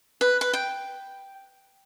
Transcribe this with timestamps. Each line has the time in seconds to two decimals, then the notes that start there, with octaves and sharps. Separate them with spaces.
0.21 B4
0.41 B4
0.53 G5